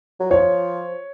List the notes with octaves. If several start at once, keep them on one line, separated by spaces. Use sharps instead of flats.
F#3
F3 C#5